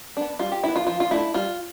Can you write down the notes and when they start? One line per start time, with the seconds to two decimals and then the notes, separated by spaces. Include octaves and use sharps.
0.17 B3 D4
0.39 G3 F4
0.52 G4
0.63 B3 D4 E4
0.76 F4
0.87 F3 F4
1.00 F4
1.11 A3 D4 E4
1.34 G3 F4